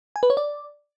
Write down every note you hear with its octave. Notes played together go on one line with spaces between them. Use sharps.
G#5
B4
C#5
D5